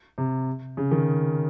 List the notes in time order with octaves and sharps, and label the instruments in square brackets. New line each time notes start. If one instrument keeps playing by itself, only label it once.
[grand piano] C3
C#3
D#3